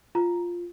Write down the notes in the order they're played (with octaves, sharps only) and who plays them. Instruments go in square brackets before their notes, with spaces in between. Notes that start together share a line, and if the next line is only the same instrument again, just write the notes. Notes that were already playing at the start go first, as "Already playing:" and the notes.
[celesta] F4 A#5